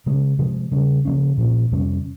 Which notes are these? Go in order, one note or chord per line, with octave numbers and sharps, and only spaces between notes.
C#3 G#3 C#4
C3 F3 G#3
C#3 G3 C#4
C#3 F3 A#3 C#4
A#2 F3 A#3 C#4
F2 C3 G3 C#4